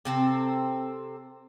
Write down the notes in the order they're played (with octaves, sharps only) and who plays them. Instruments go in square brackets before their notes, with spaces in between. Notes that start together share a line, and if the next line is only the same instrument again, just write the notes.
[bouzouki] C3 C4 A4